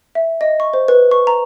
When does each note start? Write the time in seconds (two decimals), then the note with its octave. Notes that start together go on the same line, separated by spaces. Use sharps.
0.15 E5
0.41 D#5
0.60 C#6
0.73 C5
0.88 B4
1.11 C#6
1.27 A#5